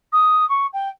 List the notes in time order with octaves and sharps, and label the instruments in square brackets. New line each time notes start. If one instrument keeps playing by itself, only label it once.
[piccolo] D#6
C#6
G5